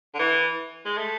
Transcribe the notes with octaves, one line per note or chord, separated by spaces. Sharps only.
D3
E3
G#3
A3